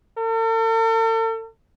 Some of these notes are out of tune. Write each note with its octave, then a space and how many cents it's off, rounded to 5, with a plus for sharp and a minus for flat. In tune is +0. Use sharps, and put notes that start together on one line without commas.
A4 +45